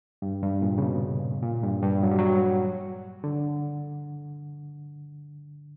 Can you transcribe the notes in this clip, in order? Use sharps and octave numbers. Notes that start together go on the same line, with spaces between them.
G2
G2
A#2
C#3
B2
A#2
G2
G2
F#3
G3
F#3
D3